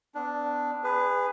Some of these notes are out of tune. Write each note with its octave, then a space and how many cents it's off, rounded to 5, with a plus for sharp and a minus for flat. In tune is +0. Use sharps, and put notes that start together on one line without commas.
B3 +30 D4 +0
G#4 -25 B4 +15